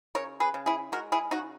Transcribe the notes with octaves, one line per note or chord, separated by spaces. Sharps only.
C#3 A#4 C#5
G#4 B4
C#3
E4 G#4
G#3 F#4 A#4
E4 G#4
C#3 D#4 F#4